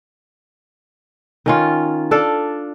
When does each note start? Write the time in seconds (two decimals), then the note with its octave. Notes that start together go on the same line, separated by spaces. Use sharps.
1.46 D#3 C#4 F4
2.11 D4 A4 D5 F5